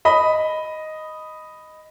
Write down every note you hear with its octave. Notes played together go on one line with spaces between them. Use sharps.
D#5 B5